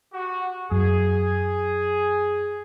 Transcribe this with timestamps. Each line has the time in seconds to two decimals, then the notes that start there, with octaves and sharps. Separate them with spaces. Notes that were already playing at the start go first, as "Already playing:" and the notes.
0.13 F#4 G4
0.71 F#2 G#4